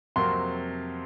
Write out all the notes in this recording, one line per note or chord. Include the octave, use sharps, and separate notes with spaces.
F2 C3 F#3 A#3 C6